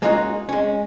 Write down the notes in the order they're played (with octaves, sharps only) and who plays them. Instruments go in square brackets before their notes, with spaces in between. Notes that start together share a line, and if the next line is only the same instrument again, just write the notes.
[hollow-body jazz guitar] G#3 A#3 C#4 D#4 F4 F#4
G#3 C#4